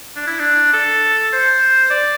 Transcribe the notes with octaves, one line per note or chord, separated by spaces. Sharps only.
D4
E4
D4
A4
C5
D5